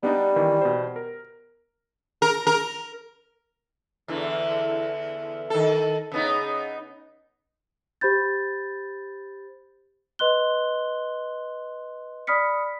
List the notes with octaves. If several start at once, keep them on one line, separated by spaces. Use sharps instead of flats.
G3 B3 D4 D#4
D#3 E3
B2 C5
A#4
A#4
A#4
E2 D3 E3
D#3 A4
C#3 B3 D#4
G4 C5 B5 G6 A6
B4 D#5 C6 F#6 G7
D5 B5 D#6 F6 B6 C#7